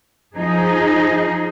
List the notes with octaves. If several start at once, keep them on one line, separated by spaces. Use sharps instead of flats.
F3 D#4 G#4